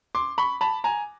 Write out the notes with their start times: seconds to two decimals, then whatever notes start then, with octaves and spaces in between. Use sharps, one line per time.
0.15 C6 D6
0.38 B5 C#6
0.61 A5 B5
0.84 G#5 A#5